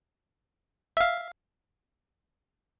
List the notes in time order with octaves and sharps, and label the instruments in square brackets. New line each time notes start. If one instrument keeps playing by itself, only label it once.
[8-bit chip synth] E5 F5